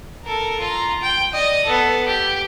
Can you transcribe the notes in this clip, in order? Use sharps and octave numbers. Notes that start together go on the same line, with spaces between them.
A4 A#4
F4 A#5
G5
D5 D#5
B3 A4
G4